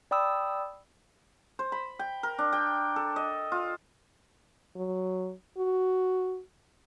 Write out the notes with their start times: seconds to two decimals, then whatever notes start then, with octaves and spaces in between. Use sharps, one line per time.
0.11 D5 G5 B5 D#6 E6
1.59 C5
1.72 B5
1.99 G5
2.23 A#4
2.38 D4
2.53 G5
2.96 A4
3.16 D#5
3.52 F4
4.76 F#3
5.58 F#4